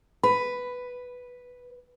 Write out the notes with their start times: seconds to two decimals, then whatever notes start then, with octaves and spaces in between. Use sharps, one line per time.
0.23 B4 B5